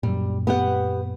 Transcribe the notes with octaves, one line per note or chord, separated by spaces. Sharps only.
F#2 A#2 G3
B3 G4 F#5